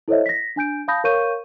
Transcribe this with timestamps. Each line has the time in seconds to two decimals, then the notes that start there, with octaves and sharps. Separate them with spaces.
0.08 E4 A4 C5 C#5 D#5 E5
0.26 A#6 B6
0.56 D4 G#5 G6 D7
0.88 F5 A5 B5 D#6 G6 A#6
1.04 A#4 C#5 F5 C#6 G6 D#7